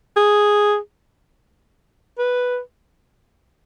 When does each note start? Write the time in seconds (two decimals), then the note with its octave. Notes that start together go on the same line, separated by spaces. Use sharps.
0.17 G#4
2.19 B4